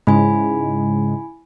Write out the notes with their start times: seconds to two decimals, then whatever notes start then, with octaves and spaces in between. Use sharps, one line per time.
0.07 G#2 C#3 G#3 E4 G#5 B5